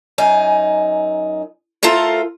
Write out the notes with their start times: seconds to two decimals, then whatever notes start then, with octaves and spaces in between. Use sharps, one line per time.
0.18 F#2 D#4 G#5
1.83 A3 F4 A4 A#4 C5